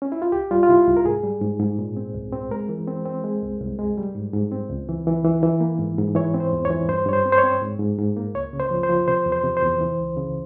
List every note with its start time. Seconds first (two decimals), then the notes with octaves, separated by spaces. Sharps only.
0.02 C#4
0.12 E4
0.22 F4
0.32 C2 G4
0.51 G3 F4
0.63 F4
0.68 C3 E4
0.87 C2
0.97 A#4
1.05 G#2 G#4
1.23 G3
1.41 G#2
1.60 G#2
1.79 A#2
1.97 C4
2.14 C2
2.32 C4
2.51 G#3 A#4
2.69 E3
2.88 C4
3.06 C4
3.24 G#3
3.43 C2
3.61 C2
3.79 G#3
3.97 G3
4.15 G#2
4.33 G#2
4.52 C4
4.70 C#2
4.89 E3
5.07 E3
5.24 E3
5.43 E3
5.61 A#3
5.79 G#2
5.98 G#2
6.15 E3 C#5
6.34 C4
6.40 C5
6.53 E2
6.65 C#5
6.70 E3
6.89 G2 C5
7.06 G2 C#5
7.13 C5
7.26 C4
7.32 C5
7.38 C#5
7.44 C4
7.62 G#2
7.79 G#2
7.98 G#2
8.17 A#3
8.34 C#2 C#5
8.53 C#3
8.60 C5
8.71 F3
8.83 C5
8.89 F3
9.08 C3 C5
9.26 E2
9.32 C5
9.44 C3
9.57 C5
9.62 E2
9.81 E3
9.99 C#2
10.17 C#3